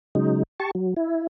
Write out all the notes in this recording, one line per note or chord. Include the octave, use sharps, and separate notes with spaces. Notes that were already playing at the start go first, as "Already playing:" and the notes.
C#3 F#3 G#3 D#4
G4 A5 C#6
F#3
E4